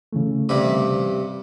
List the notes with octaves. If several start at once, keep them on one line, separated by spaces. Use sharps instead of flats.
C#3 E3 A3
G2 C3 B5